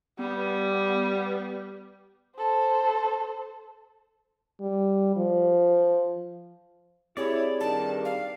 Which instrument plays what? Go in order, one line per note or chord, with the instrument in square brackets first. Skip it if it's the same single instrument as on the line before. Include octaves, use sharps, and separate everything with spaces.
[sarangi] G3 [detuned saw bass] B3
[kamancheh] A4 C5
[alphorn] G3
F3
[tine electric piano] C4 G4 G#4 [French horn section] E4 [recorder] C#5 [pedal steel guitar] D5
[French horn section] G2 D#3 [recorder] A5
[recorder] F5